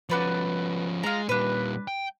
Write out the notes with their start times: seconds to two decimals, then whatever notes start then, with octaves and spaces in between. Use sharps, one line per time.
0.09 F3 C#4 F#4 B4 D5
1.03 G#3 F4 A#5
1.29 A#2 G3 D4 B4
1.88 G5